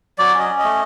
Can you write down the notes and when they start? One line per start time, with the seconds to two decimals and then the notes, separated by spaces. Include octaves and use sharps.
0.18 F#3 D5
0.34 C#4
0.39 D#5
0.49 C#4
0.59 A3 D#5